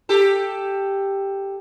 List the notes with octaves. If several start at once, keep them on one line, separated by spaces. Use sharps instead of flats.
G4 A4